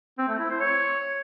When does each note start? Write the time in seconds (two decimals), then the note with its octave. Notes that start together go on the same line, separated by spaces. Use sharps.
0.18 C4
0.29 A3
0.39 E4
0.50 C5
0.60 C#5